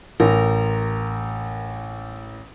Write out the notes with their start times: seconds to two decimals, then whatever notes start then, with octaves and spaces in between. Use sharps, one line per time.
0.20 A1 A#4